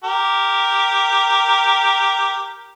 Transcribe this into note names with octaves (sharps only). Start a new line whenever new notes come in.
G4 A#4